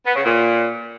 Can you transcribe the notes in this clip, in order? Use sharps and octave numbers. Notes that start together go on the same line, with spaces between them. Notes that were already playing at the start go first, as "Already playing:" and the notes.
B3
C#3
A#2